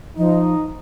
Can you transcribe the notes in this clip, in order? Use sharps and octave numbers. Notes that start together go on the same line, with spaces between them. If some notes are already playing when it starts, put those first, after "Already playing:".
F3 D#4